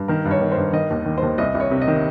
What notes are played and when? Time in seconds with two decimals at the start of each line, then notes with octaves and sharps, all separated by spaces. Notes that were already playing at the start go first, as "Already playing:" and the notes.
Already playing: G2
0.08 D#3 A#4
0.25 G2
0.31 C#5
0.41 D#3
0.52 C5
0.57 G2
0.73 D#3 D#5
0.90 D#2
1.06 D#3
1.18 D#2 C5
1.38 C2 D#5
1.55 C2
1.60 C#5
1.71 C3
1.82 D#5
1.88 D#3